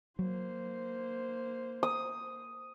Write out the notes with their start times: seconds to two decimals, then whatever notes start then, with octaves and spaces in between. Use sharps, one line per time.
0.19 F#3 A#3 C5
1.83 D#6